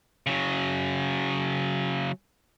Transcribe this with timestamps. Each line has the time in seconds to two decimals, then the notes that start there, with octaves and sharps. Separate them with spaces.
0.27 C#3 F#3